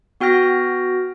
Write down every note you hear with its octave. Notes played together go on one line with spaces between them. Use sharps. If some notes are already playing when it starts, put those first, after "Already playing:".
B3 F#4 G5 F6 A#6